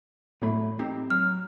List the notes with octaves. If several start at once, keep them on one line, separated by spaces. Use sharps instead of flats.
E2 A2 F#3 A3 B5
C4 D#4 G4
F#3 F6